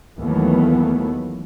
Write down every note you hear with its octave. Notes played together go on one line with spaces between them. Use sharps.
D#2 E3 F#3 A3 B3